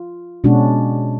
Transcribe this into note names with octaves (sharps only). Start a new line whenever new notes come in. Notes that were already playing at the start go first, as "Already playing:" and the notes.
Already playing: F4
B2 G#3 C#4 D4 F#4